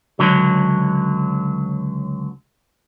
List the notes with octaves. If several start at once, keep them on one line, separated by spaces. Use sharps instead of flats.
C#2 D3 F#3